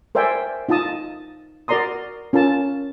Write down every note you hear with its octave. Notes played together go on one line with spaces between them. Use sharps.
A#4 C5 D5 E5 G5 G#5
D#4 F4 D#5 A5 D#6
F#4 A#4 D5 A#5 C6 D#6
C#4 F4 A#4 A5